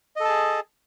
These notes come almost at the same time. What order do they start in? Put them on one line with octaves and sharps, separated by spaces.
D#5 A4 A5 G#4